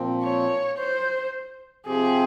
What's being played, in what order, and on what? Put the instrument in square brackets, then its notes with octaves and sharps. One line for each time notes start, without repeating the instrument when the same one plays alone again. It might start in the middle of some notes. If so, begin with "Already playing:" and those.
Already playing: [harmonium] A#2 F3 C4
[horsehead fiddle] C#5
C5
[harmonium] C3 F3 C4 G4 [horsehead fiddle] G#4